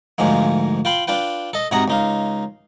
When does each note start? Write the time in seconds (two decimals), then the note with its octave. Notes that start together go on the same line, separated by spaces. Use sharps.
0.18 D2 G#2 F3 G#3 A#3
0.85 F4 G5 B5 C6
1.08 D4 F4 B4 G5
1.53 A4 D#5
1.71 G#2 C3 F#4 F#5 A#5 D#6
1.88 C#2 D#4 F5